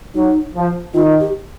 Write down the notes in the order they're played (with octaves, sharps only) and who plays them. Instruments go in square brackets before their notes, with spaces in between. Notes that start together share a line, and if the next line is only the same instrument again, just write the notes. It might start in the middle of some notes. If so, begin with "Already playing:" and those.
[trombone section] F#3 [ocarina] D#4
[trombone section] F3
[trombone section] D#3 [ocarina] F4
[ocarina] G4